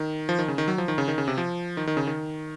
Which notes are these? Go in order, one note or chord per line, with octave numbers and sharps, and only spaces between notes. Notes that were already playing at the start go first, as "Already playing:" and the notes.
Already playing: D#3
F3
D#3
C#3
D#3
F#3
F3
D#3
C#3
D#3
C#3
C3
F3
D#3
D#3
C#3
D#3